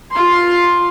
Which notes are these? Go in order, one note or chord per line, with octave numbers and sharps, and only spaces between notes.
F4 C6